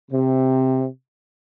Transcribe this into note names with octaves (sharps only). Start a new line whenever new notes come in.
C3